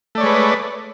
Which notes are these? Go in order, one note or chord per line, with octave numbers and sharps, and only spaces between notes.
G#3 A3 B4 C#5 D5